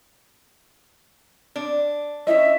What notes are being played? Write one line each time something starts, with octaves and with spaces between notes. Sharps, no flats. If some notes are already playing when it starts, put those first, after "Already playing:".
D4
C#4 E4 D#5 E5